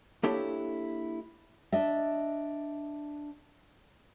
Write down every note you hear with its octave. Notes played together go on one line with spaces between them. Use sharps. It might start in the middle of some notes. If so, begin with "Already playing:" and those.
A#3 D4 E4 G4 A4 C#5
D4 D#5 E5